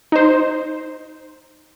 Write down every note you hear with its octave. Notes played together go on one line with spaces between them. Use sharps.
D#4 C5